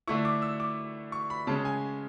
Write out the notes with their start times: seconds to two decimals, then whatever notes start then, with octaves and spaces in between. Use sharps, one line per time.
0.07 D3 A3 E4 C#6
0.25 D6
0.42 E6
0.60 D6
1.12 C#6
1.30 B5
1.47 C#3 G#3 C#4 A5
1.65 G#5